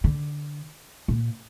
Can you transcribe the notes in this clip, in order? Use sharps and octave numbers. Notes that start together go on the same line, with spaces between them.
D3
A#2